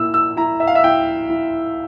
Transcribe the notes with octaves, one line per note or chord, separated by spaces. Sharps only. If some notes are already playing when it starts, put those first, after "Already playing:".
Already playing: A#2 A#3 E4 E6
E6
E4 A#5
E5
F5
E5
E4 G5
E4